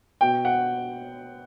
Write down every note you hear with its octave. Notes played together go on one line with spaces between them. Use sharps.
B2 G5
F#5